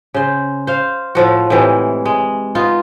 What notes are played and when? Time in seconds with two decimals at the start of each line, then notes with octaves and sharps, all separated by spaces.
0.14 C#3 C5
0.67 C5 F5
1.15 A2 F3 F#4
1.50 A2 C3 E3 G#3
2.05 G#3
2.55 B3 D#4 F4